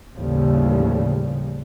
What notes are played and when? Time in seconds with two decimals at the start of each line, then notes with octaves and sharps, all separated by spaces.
0.14 A1 D#2 C#3 F3 G3